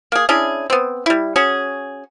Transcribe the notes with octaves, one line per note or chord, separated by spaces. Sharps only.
A#3 G#4
C#4 D4 E4 G#4
B3 C4
G3 E4
C#4 F#4 G#4